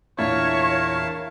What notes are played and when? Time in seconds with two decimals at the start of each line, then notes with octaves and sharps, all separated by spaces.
0.19 E2 A#2 D4 E4 A#4 C#5 F5 A5